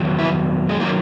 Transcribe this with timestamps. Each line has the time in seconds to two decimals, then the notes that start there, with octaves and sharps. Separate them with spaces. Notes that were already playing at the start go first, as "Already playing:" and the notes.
Already playing: E2 D#3 F#3
0.19 E4
0.69 G#3
0.80 D#3 F#3 A#3